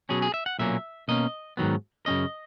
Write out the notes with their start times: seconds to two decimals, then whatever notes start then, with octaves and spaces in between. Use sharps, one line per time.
0.09 B2 F#3 C#4 G#4
0.22 G#4
0.34 E5
0.46 F#5
0.59 B1 A#2 F#3 A#3 C#4 E5
1.08 B2 A#3 C#4 D#5
1.57 G#2 D#3 F#3 B3
2.06 F#2 C#3 G#3 C#4 D#5